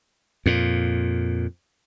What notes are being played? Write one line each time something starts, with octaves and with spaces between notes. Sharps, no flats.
F2 A#2